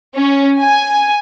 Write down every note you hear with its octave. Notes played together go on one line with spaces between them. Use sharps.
C#4
G#5